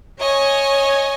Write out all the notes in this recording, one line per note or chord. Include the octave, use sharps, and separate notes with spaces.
C#5 D#5 G#5